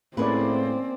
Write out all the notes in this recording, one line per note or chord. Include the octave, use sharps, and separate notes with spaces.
A2 A#3 C4 C#4 E4 G#4 B4 D5